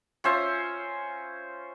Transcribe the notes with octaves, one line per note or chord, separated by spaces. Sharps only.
C#4 F4 C5 E5